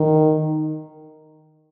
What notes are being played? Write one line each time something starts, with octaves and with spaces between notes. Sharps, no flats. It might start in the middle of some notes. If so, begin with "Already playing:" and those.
Already playing: D#3